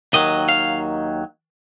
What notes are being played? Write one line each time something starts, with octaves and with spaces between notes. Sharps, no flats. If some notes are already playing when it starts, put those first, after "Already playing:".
D#2 D#3 F#3 D#5
F5